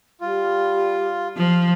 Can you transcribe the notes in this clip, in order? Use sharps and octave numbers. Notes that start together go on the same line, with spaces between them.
G3 F4
F3